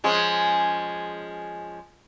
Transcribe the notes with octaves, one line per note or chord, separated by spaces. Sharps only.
F3 G#3 C#4